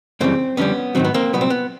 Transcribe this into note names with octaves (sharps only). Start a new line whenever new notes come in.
F#2 C#3 E3 G3 A#3 C4
F2 D3 G3 B3 C#4
G#2 D#3 F#3 C4
B3
A#3 C4
C2 A#2 F#3 B3
C4
B3